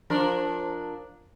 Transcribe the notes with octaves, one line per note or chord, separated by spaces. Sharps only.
F3 D4 A#4